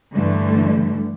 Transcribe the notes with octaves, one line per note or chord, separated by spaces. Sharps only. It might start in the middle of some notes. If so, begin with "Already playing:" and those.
G2 D3 E3 G3 A3